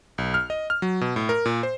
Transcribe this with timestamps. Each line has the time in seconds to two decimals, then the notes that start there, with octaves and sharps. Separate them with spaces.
0.18 B1
0.34 F6
0.50 D#5
0.70 F6
0.82 F#3
1.01 B2
1.16 A2
1.29 A#4
1.46 A#2
1.63 C5